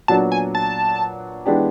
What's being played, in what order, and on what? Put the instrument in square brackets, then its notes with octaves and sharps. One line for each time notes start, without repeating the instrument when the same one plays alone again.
[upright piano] A#2 F#3 B3 D4 F#4 [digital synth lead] A5
[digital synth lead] G#5
A5
[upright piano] E3 G#3 B3 D4 G4